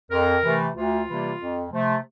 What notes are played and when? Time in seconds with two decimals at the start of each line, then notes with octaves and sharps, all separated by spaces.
0.11 F2 A#4
0.43 C3 E3 A3
0.75 D2 F4
1.07 C3 E3 G3 A#3
1.39 F2
1.71 C3 F3 A3